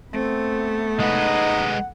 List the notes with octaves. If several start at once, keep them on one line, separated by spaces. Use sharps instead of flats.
A3 B3 C4
G#3 D#4 B4 D#5 F#5